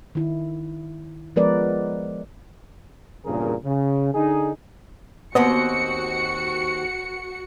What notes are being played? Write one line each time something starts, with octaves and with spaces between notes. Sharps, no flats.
D#3 E4
F3 G#3 B3 A#4 B4 D5
E2 G2 A#2 C#3 G#4 A#4
C#3
D3 D#4 G#4
D#2 B3 C4 F#4 D#5 C#7